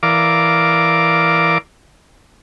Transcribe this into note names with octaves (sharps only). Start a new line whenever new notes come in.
E3 A#4 D5 F5 D6